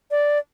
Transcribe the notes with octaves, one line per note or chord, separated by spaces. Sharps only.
D5